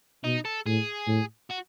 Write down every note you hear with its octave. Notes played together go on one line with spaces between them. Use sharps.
B2 D#4
A4
A2 G#4
A2
F#4